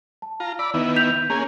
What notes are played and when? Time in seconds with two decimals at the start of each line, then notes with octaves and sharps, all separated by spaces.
0.22 A5
0.40 F4 A#5
0.59 D5 B5 E6
0.74 D#3 B3 E4
0.96 G6 B6 F7
1.30 A#3 C#4 G#4 A#5